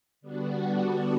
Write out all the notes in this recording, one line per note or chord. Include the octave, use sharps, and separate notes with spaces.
D3 G3 B3 D4 F#4